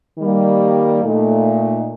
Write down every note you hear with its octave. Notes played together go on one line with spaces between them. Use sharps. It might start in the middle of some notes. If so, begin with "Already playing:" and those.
D#3 G3 A#3
A#2 A3 D#4